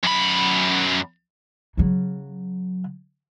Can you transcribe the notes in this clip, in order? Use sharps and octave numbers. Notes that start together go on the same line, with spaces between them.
F#2 B5
C#3 F#3